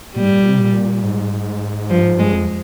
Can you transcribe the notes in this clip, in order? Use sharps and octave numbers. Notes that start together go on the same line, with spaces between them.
A#2 G3
G#2
A#2
C3
A#2
G#2
G2 F3
G#2
G2 G#3
F2